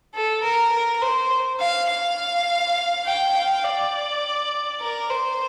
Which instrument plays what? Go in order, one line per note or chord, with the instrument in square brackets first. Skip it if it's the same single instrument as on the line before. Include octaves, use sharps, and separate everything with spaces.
[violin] A4
A#4
A#4
C5
F5
F5
G5
F5
D5
A#4
C5